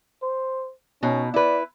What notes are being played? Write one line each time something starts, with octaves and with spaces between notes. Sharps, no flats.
C5
B2 C#4 D#4
E4 B4 D5